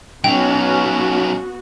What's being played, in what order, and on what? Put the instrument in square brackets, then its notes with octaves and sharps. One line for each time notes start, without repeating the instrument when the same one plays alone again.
[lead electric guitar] F#3 D#4 [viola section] B3 F#4 [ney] C#4 [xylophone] G5